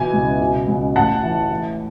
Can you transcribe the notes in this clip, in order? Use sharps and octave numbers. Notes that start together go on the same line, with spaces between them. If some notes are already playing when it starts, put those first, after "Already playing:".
Already playing: B2 E3 G#5
C#2
B2
C#2
A1 F#5 A5
E3
E3